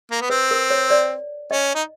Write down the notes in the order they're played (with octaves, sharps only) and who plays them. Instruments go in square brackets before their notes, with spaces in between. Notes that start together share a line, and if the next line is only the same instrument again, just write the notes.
[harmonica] A#3
B3
[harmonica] C4 [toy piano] B4
[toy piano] A#4
C#5
D5
[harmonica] C#4 [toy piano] D#5
[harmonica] D#4